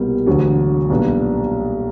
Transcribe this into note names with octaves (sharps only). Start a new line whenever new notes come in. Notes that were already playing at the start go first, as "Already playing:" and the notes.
Already playing: C2 B2 G3 A#3
E1 D2 D3 F#3
B1 A#2 G3 B3 D4